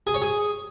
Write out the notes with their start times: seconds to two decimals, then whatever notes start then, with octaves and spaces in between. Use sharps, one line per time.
0.07 G#4
0.14 C#5
0.22 G#4